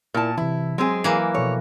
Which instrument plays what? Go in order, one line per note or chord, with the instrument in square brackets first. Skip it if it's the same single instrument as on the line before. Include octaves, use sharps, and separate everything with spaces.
[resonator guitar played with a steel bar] A#2 A5 [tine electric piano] E4 A#4
[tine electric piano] C3 E3 [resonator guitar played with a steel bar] E4
[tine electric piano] F#3 G#5 [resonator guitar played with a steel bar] G#3 C4 G#4
[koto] E3 A#3
[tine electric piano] B2 F3 A4 [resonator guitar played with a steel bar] C#5